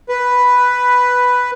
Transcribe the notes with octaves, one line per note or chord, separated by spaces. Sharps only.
B4